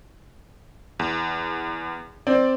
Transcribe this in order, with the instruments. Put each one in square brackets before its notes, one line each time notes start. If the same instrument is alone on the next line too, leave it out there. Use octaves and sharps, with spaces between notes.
[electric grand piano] E2
[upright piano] C4 [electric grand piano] D5